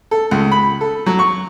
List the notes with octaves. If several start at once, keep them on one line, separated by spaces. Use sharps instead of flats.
A4
C#2
B5
A4
F#3
C#6